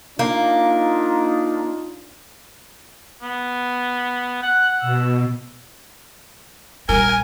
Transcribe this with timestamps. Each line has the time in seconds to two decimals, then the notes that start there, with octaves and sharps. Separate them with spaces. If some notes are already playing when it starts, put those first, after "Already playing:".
0.19 A#3 D4 D#4 F4
3.22 B3
4.43 F#5 F#6
4.81 B2 E6
6.89 A#1 G3 A#4 G#5